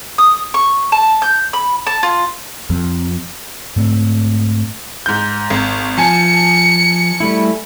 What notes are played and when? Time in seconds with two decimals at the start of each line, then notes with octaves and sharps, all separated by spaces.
0.18 D#6
0.54 C#6
0.92 A5
1.22 G6
1.53 B5
1.87 A5
2.03 F4
2.70 F2
3.76 G#2 A3 C4
5.06 G#2 G6
5.50 G#1
5.98 F3 G#5 A5 C#7
7.20 G3 A3 E4